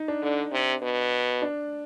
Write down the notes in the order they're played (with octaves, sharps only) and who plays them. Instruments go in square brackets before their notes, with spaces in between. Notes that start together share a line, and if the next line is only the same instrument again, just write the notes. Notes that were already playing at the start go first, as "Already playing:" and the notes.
Already playing: [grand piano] D#4
D4
[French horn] D3
C3
B2
[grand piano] D4